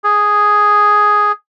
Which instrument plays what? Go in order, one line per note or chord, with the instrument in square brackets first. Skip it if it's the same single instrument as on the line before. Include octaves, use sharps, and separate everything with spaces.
[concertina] G#4